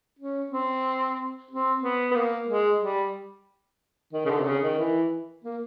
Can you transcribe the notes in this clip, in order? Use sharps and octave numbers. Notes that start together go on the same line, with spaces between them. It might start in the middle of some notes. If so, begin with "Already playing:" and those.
C#4
C4
C4
B3
B3
A#3
G#3
G3
D#3
C#3
D3
C3
C#3
D#3
E3
A#3